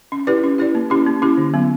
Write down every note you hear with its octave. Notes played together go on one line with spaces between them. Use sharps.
C#4
E4 G4 B4 D5
C#4
E4 G4 B4 D5
A#3
C#4 E4 G4
A#3
C#4 E4 G4
D3
F#3 B3